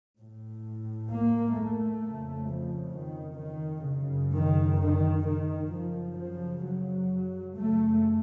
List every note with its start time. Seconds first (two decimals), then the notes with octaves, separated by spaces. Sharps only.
0.19 A2
1.10 A#3
1.57 A3
2.03 F2 C#3
2.49 F3
2.95 D#3
3.41 D#3
3.87 F#2 C#3
4.33 D#3
4.79 D#3
5.25 D#3
5.71 F#2 C#3 F3
6.17 F3
6.64 F#3
7.55 F#2 C#3 A3